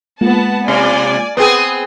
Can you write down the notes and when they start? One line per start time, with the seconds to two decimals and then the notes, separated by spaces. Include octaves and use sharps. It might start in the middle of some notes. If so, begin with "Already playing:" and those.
0.21 G#3 A#3 B3 F4 F#5 A5
0.68 C3 D5 G#5
1.37 B3 C4 G#4 B4 D#6